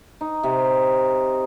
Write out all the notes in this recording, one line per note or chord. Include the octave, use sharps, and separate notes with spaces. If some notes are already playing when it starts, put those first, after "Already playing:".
D#4
C3